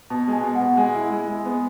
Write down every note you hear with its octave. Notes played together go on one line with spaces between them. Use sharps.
B2 A5
G#3
G#5
B2
F#5
B2
G#3 G#5
E4
G#3
G#3
B3